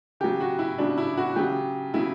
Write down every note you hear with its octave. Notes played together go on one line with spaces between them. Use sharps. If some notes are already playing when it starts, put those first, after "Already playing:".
C#3 F#3 G4
F#4
E4
C#3 F#3 D4
E4
F#4
C#3 F#3 G4
C#3 F#3 E4